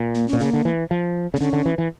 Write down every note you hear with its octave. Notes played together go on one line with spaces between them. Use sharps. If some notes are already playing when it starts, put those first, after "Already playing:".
Already playing: A#2
A#3
C#4
A#2
C#3 A#3
D3
E3
F3
C#3 A#3
D3 C#4
D3
E3
E3